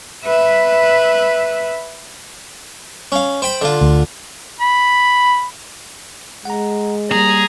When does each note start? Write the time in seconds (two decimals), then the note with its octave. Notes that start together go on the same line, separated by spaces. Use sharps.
0.24 B4 E5
3.12 C#4 F5
3.42 C5 G5 B5
3.61 D3 F4
3.81 D2
4.60 B5
6.45 G#3 F#5 A#5
7.11 G3 A#3 G#4 A#5